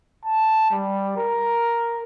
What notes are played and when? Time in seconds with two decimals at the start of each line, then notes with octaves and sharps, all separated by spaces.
0.25 A5
0.71 G3
1.17 A#4